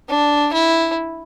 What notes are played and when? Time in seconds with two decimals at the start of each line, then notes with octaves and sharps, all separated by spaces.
0.09 D4
0.53 E4